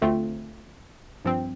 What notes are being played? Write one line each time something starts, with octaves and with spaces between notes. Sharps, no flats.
D2 D3 A3 C4 F4
G2 F3 C4